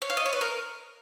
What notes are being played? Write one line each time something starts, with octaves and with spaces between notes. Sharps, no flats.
C#5
F5
D#5
C#5
B4
A#4